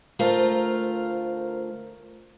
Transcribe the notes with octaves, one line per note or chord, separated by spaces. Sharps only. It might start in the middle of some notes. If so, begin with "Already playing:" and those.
D2 A3 F4 A#4 C5